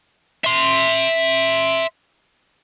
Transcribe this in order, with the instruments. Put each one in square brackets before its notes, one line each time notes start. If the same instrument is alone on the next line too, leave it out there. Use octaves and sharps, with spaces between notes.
[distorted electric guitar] E5 C6